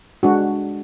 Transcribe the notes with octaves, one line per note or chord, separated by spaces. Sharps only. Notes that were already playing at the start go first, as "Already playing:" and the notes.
G#3 D4 F#4